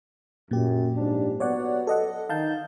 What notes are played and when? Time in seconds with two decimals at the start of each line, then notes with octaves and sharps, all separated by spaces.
0.51 F#2 A#2 G4
0.96 G#2 F3 D4
1.40 F#3 B3 C#5 D5 F#5
1.87 A4 D#5 F#5
2.29 D#3 D#4 F5 A5 G6